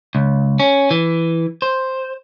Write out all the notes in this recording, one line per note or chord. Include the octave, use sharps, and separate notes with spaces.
C#2
C#4
E3
C5